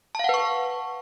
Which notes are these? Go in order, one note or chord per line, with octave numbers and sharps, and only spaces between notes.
B4 F5 F#5 A5 C#6